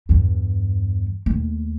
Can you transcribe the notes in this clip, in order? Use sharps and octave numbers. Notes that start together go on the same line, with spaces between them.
E2 G2
D#2 A3